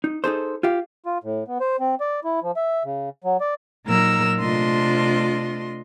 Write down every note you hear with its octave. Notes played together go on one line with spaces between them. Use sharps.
D#4
D#4 G#4 A4 C5
F4 G4 F5
F4
A2
B3
C5
C4
D5
E4
F3
E5
C#3
F#3
D5
A#2 F#3 D#4 A#4 A#5 E6
C3 A3 D4 F4 D#5 C6